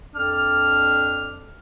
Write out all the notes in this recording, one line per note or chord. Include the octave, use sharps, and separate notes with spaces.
F2 D4 F6